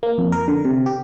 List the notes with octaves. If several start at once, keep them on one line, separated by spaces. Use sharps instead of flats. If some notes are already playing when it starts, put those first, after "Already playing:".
A#3
F2
A#4
D3
C3
G4